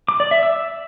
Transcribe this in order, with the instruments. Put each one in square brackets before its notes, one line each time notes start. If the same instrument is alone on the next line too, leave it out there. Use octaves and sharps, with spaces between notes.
[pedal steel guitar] D6
D5
E5
E6